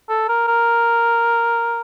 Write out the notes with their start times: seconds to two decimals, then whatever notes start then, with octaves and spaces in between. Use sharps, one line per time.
0.09 A4
0.28 A#4
0.48 A#4